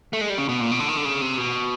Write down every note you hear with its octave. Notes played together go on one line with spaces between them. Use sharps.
A3
G#3
G3
C#3
B2
A#2
B2
D3
D#3
D3
C#3
C3
B2